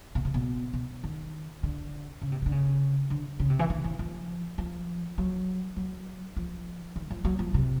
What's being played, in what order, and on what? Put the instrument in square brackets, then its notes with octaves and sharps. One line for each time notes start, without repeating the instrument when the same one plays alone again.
[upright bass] B2
C3
B2
B2
D#3
D3
C#3
C3
C3
D3
C#3
D3
C#3
C3
E3
D#3
E3
F3
F3
F#3
F#3
F3
D#3
F3
F#3
F3
C3